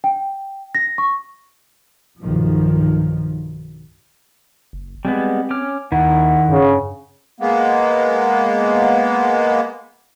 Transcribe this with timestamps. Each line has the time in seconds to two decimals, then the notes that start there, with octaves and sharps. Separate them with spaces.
0.04 G5
0.75 A#6
0.98 C#6
2.21 B1 G2 D#3 F3
4.73 F#1
5.05 G3 G#3 B3 C4
5.50 C#4 D6 F6
5.92 D#2 D#3 E4 F#5
6.49 G2 C#3
7.40 G#3 A#3 B3